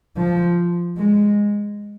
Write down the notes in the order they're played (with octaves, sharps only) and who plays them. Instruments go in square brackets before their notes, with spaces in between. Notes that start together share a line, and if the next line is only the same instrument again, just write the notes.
[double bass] F3
G#3